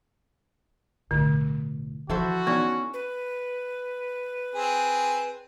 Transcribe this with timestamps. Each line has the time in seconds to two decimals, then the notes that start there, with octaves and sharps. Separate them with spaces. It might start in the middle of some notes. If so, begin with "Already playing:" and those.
1.11 B1 A2 D3
2.10 E3 F3 E4 F#4 A4 C5
2.47 B3 C#4 D#4 D5
2.94 B4
4.55 C4 G#4